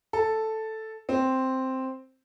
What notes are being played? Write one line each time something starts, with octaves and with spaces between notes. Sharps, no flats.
A4
C4